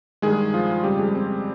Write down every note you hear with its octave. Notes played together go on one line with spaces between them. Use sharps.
G2 D#3 G#3 G#4
F3 F4
F4
F2 C#3 G3 G4
G#3 G#4
C4 C5